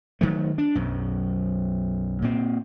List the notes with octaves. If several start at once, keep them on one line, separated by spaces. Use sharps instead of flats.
D#3 F#3 A3
D4
B1 F#2
A#2 C4